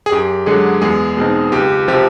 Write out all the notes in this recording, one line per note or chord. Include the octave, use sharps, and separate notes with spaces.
G#4
F#2 G4
D3 F#3 G#3 G#4
E2 G#3 G#4
B2 G#3 C4 D#4
C#2 G4
C3 F3 G4